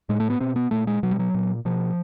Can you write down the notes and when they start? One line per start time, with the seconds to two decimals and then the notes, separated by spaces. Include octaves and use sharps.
0.09 A2 G#3
0.20 A3
0.30 B3
0.40 B2 C4
0.56 B3
0.71 A#2 A3
0.87 G#3
1.03 B2 F#3
1.11 G3
1.19 F#3
1.34 A#2
1.65 B2 F3